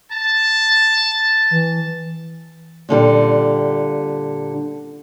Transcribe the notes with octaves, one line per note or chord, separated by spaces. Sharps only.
A5
E3
A#2 D3 G3